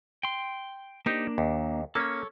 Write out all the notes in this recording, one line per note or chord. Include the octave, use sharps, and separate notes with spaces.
G5 C6
A#3 D4 D#4 G4 C5
D#2
A#3 C#4 A4 C#5